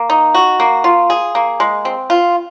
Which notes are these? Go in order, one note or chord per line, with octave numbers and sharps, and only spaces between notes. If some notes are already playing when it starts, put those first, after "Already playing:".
Already playing: A#3
D#4
F#4
A#3
F4
G#4
A#3
G#3
C4
F4